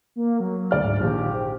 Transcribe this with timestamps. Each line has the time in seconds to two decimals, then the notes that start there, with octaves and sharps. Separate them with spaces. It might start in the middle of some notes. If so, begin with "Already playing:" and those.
0.16 A#3
0.40 F#3
0.71 D2 D5 F6
0.83 G#2
1.01 A#1 D#2 G4
1.34 C5